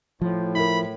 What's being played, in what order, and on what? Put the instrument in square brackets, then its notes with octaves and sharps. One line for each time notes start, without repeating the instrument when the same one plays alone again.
[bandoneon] A2 [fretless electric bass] F3
[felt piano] E4 A#4 [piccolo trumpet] B5